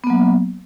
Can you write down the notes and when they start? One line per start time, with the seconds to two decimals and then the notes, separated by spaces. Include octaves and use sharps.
0.04 B3
0.07 A#3
0.10 F#3